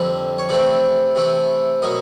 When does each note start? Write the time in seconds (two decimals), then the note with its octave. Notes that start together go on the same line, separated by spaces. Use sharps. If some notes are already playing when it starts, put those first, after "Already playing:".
Already playing: F2 D3 G3 C4
0.38 C#5
0.49 C3 E3 A3 C4 E4 D5
1.15 C3 E3 A3 C4 E4
1.82 B2 F#3 A#3 D#5